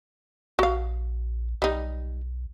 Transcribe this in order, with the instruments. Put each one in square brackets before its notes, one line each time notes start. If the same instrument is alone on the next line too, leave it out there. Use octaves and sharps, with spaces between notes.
[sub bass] A#1 [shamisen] F#4 F5
[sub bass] B1 [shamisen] G3 D#4